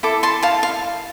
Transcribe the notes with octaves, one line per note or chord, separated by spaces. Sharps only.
E4 A4 D6
A5 C6
F5 A5
F5